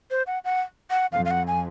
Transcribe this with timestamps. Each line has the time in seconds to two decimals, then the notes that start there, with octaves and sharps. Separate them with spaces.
0.11 C5
0.27 F#5
0.45 F#5
0.90 F#5
1.12 F2 F5
1.25 F5
1.31 F#5
1.47 G#5